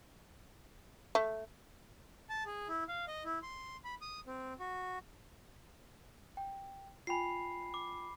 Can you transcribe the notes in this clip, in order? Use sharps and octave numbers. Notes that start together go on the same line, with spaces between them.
A3
A5
G#4
E4
F5
D#5
E4
C6
B5
D#6
C4
F#4
G5
F4 G5 G#5 B5 C7
D6